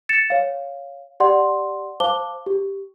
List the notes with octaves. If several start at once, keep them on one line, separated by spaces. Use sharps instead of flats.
A6 C#7 E7
C#5 F5
G4 D5 F#5 C6
C5 F5 A5 D6 G7
G4